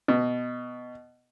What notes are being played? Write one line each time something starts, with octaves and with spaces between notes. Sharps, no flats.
B2